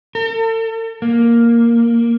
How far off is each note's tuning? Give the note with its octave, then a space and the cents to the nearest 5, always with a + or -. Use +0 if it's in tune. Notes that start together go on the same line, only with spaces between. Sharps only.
A4 +40
A#3 +0